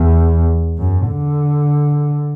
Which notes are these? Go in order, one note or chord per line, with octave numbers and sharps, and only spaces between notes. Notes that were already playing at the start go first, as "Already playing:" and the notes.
Already playing: E2
F#2
D3